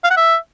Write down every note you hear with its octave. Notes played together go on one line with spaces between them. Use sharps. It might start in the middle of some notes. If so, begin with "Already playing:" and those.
F5
F#5
E5